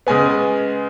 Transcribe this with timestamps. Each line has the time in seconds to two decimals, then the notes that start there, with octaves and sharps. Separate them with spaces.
0.07 C#3 G#3 B3 G#5